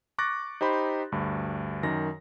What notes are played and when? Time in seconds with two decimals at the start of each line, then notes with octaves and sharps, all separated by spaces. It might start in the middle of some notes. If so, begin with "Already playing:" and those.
0.18 C#6 D6 F#6 A6 A#6
0.61 D#4 G4 C5 B5 C6
1.12 D2 G2
1.83 F#2 D#3 A#6